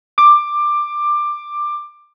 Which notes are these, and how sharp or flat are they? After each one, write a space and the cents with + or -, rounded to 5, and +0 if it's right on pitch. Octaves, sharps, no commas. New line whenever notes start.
D6 +15